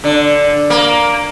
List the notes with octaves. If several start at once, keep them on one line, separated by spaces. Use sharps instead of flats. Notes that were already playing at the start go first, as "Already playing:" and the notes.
D3
A#3